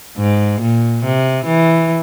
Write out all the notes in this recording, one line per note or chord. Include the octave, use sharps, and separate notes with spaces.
G#2
A#2
C3
E3